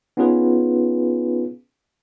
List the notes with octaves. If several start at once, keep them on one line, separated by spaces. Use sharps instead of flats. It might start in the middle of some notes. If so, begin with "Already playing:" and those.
B3 C#4 D#4 F4 G#4 B4